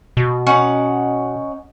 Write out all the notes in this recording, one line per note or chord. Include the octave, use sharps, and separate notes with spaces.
B2
C#4 D#4 F#5